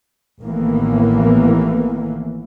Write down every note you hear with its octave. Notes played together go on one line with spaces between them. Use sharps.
A1 A2 D#3 E3 A#3 B3